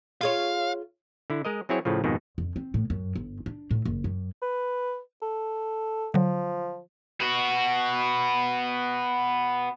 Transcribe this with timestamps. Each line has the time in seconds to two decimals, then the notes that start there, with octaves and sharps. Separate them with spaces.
0.21 F4 G#4 C#5 F5
1.30 D3 E4
1.45 G#3 A#4 D#5
1.69 F#3 C4 E4 G#4 C#5
1.85 A2 C#3 F3
2.04 F2 G#2 B2 D#3
2.38 F2
2.56 C4
2.74 A2
2.90 F#2
3.16 G1
3.46 D4
3.71 A2
3.85 F#1
4.04 F#2
4.42 B4
5.22 A4
6.14 D3 F3 F#3
7.21 B3 F#4